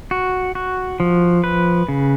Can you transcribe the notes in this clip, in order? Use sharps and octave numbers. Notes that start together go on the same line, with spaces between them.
F#4
F#4
F3
B4
C#3